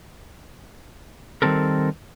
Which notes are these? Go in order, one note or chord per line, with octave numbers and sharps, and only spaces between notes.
D#3 G3 C4 A4 A#4